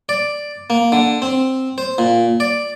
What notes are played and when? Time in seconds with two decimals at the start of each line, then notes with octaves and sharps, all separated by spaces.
0.09 D5
0.70 A#3
0.92 D3
1.22 C4
1.78 C5
1.98 A#2
2.40 D5